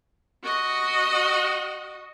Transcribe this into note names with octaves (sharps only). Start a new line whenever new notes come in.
F#4 D#5